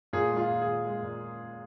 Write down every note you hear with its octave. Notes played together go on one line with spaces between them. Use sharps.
A#2 G#4
G#3
F4
A#2
A#2 G#4
G#3
A#2